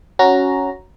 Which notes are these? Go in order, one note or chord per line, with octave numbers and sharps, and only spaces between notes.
C#4 F#4 A#5